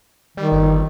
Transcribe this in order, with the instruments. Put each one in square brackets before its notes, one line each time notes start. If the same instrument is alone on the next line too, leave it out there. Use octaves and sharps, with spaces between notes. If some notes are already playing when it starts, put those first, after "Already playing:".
[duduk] D#3 [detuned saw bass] G3
[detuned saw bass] G1